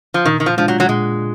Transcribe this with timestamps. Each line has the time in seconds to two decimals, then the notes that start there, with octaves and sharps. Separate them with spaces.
0.14 F3
0.25 A#2 D#3
0.40 D#3
0.46 F3
0.57 F3 G#3 D4 F4
0.68 F#3
0.80 F#3
0.89 A#2 G#3